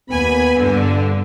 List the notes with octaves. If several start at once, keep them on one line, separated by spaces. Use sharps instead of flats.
D#2 B3 G#5 B5
G2 A#2 D3